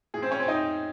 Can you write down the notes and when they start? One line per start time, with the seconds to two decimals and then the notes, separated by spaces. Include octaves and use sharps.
0.14 A2 G#4
0.17 E3
0.22 C4 C5
0.31 C#4 C#5
0.40 C4 C5
0.48 D#4 D#5